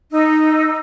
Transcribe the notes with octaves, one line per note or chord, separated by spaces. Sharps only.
D#4 E6